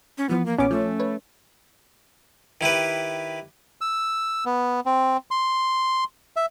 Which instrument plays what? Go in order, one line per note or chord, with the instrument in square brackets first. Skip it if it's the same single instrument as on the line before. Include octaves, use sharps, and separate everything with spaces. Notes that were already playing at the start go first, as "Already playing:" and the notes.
[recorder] C#4
[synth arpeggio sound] E3 F3 [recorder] B3
[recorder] A#3
[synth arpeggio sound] A#1 D6 [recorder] B3 [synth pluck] C#4
[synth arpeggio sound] F3 [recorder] A3
[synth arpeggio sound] B4 C#5
[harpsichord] D#3 E4 G4 B4
[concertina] E6
B3
C4
C6
E5